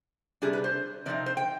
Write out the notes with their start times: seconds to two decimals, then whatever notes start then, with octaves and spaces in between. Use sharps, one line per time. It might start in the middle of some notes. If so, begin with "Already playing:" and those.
0.42 C3 G3 D4 G#4
0.53 B4
0.64 C5
1.06 C3 F3 C4 D#4 D5
1.26 C5
1.37 G5